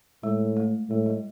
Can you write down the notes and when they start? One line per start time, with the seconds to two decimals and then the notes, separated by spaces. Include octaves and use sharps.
0.23 A2 G#3
0.57 A3
0.90 A2 G#3
1.06 G3